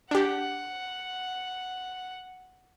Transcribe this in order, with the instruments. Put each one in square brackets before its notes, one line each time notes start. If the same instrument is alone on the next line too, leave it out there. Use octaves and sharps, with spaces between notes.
[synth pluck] D4 G4 [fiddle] F#5